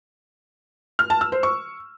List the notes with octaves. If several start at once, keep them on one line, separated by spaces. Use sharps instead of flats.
F6
A5
E6
C5
C#6